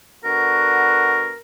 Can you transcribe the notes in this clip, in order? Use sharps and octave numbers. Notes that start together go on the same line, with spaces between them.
D3 B3 F#4 A#4